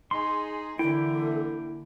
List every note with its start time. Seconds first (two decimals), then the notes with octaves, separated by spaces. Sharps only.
0.11 D#4 G#4 C6
0.79 D3 E3 A#3 E4 A4 G5